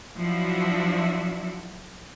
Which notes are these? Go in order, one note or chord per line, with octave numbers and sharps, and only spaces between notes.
F3 F#3 D4 E4 F#4 E5